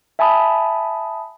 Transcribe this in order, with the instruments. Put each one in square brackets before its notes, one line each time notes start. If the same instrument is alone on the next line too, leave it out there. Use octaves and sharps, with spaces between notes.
[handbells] E5 G#5 A5 B5 D#6